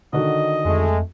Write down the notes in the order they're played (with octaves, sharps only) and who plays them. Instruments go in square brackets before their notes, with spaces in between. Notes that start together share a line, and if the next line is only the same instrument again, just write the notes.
[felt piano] D3 D#3 F#4 [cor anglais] D#5
[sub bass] F2 [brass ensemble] G#3 A3